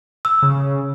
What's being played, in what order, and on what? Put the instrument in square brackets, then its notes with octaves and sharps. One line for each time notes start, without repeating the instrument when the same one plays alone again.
[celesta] E6
[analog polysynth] C#3